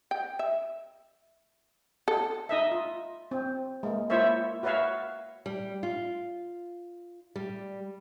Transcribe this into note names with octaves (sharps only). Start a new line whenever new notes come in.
G5
E5
A4
D#4 D#5 E5
F4
C4
G#3 A#3
A#3 E4 F4 C5 C#5 E5
F#4 B4 C#5 E5 F5
G3
F4
G3